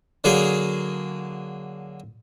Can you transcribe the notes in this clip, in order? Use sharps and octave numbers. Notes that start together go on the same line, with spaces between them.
D3 F#3 A#3 G#4